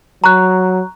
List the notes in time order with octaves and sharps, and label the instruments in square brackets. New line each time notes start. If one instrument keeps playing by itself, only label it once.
[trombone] F#3 [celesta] A#5 C#6 F#6